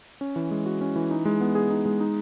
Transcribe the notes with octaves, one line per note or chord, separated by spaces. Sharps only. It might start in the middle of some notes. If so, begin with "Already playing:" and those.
C#4
E3
G#3
F#4
C#4
E3
D#4
G#3
B3
G#4
D#4
G#3
D#4